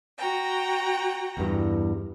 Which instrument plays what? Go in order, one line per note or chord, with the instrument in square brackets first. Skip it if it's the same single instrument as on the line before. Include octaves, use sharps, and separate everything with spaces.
[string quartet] F#4 G5 A#5
[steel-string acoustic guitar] E2 G2